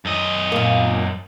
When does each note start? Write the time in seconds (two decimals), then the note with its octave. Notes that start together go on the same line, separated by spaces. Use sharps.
0.05 F#2 D#5
0.52 A#2 A#3